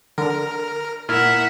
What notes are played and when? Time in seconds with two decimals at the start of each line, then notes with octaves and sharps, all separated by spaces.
0.18 D3 A#4
1.09 A#2 E4 A#4 E5 F#5 F6